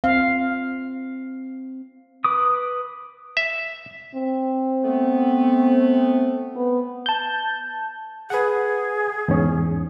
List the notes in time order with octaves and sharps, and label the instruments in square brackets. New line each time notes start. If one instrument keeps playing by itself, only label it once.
[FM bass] C4 [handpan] F5
[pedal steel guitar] B4 D6 D#6
[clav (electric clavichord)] E5
[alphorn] C4
[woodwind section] A3 B3
[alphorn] B3
[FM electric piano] A5 G6
[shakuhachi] G#4 [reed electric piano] B4 F#5
[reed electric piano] E2 G#2 C#4